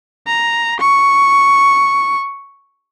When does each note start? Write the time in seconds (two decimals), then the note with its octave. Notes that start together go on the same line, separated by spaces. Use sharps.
0.27 A#5
0.80 C#6